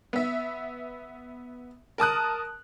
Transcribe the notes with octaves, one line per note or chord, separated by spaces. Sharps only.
B3 E5
A#4 A5 D#6 F#6